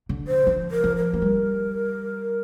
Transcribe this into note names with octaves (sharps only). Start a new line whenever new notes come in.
D3
C5
F3
A#4
F3
A#4
A#3
G3